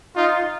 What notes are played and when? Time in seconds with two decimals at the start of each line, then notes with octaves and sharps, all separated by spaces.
0.16 D#4 F4
0.28 F4